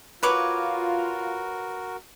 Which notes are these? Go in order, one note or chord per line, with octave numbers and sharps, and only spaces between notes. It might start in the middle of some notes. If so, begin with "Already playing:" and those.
F4 F#4 A#4 B4 C#5 D6